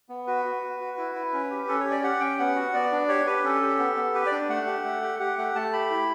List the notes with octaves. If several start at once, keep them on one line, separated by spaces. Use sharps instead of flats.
B3
F#4 B4
F#4
F#4
F#4
E4
E4
C#4
G4
C#4 A4
G4 C#5
D5
G4 F#5
C#4 G5
B3 F#5
F#4
B3 D5
D4
G4 C#5
G4 B4
C#4 A4
G4
B3
B3
G4 B4
D5
D4
A3 F#5
G4
A3
G4
G4 F#5
A3 F#5
A3 A5
G4 B5
E4